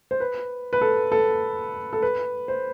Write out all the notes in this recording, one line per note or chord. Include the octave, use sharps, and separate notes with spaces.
C5
B4
B4
A4
A4
A4
B4
C5